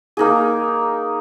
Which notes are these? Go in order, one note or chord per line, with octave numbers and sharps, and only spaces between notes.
A#3 D#4 G#4